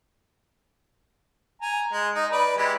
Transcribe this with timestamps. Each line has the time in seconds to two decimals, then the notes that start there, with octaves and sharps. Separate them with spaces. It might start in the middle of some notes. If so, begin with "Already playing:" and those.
1.62 G#5 A#5
1.92 G#3
2.15 D#4
2.32 B4 D5
2.57 E3 G#3 G4